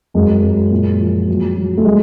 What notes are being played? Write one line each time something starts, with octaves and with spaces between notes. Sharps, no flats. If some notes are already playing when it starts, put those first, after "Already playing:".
F#2 G#3
F#2
A#2
F3
F#3
F#3
A3
F#3 G#3